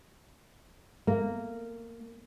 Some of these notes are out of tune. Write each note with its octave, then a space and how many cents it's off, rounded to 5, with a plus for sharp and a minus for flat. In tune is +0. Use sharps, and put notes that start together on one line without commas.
A#3 -15